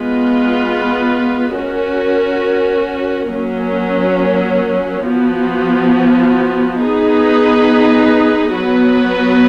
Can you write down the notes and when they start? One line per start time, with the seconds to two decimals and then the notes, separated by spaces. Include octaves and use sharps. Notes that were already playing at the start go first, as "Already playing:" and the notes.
Already playing: G#3 B3 F4 B4
1.57 C#4 F#4 A#4
3.31 F#3 A#3 C#4
5.05 F3 B3 F#4
6.79 B3 D#4 G#4 B4
8.53 F#3 B3 F#4 B4